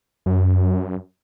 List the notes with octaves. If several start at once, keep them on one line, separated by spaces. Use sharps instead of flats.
F#2